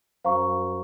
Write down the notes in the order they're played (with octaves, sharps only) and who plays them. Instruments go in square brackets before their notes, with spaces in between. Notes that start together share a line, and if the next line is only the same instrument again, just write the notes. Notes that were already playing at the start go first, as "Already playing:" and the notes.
[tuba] F#2 [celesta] C5 F5 A#5 C#6